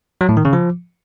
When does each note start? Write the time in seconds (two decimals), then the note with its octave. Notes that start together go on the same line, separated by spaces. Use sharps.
0.21 F#3
0.29 A2
0.37 D#3
0.45 C#3
0.53 F3